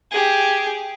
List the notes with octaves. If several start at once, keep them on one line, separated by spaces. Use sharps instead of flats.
G4 G#4